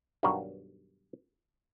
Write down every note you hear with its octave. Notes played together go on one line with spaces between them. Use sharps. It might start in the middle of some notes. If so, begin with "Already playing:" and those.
B1 G2 D#3 D4 F#4 A#4